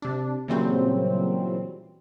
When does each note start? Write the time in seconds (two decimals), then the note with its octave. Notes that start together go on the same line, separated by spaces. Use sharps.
0.02 C3 D4
0.48 A#2 C#3 E3 F#3 G3 C4